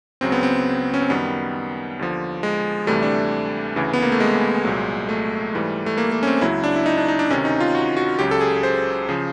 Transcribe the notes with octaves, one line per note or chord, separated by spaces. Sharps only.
C#2 C#3 F#3 C4
B3
C4
C#4
C4
F#2 D#3 G3 B3
D#2 D3 F3
G#3
D2 C3 E3 G3 A3
D4
D2 C#3 E3
B3
A#3
A3
G#3
C2 A#2 F#3
A3
G#2 E3 G3
A3
A#3
A#3
C#4
C4
C#2 C#3 F#3 E4
D4
E4
D#4
D4
D#4
D4
D2 C3 D#3 C#4
D#4
F4
F#4
F#4
C#2 C#3 F#3 G4
A4
G#4
C5
C#3 F3